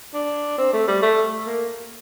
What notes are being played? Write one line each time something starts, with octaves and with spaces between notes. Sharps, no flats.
D4
C4
A3
G3
A3
A#3